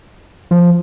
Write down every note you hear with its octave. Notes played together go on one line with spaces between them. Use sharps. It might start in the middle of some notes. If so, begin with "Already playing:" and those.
F3